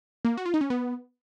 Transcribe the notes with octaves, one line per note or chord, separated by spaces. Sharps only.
A#3
F#4
F4
D#4
C#4
B3